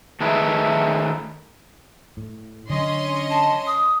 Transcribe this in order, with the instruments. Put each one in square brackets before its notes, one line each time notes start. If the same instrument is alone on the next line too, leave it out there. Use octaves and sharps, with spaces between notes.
[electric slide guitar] D#3 A3 G#4 A#4 B4 E5
[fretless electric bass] A2
[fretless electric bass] D3 F#3 [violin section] C#4 D#5 C6
[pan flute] A5
D#6